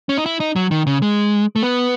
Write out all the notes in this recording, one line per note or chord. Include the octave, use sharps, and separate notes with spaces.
C#4
D#4
E4
D#4
F#3
D#3
C#3
G#3
A3
B3